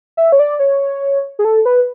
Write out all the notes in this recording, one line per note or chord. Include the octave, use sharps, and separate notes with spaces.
E5
C#5
D5
C#5
G#4
A4
B4